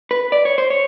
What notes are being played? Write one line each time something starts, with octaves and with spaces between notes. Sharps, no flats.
B4
D5
C#5
C5
C#5